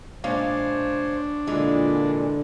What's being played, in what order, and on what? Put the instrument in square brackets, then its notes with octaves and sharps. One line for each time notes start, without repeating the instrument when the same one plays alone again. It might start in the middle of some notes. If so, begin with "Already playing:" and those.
[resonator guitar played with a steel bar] A#2 G#3 F5 [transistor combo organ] D4 [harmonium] C5 C#5
[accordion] A#2 [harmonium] D3 [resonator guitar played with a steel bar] E3 G#3